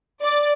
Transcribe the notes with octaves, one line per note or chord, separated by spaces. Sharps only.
D5